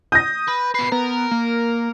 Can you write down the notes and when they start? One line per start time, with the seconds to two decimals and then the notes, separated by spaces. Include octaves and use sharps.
0.12 D#6 G6 A#6
0.48 B4
0.75 B2 B4 C7
0.92 B3 A#4
1.31 A#3